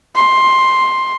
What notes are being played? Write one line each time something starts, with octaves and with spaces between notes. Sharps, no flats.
C6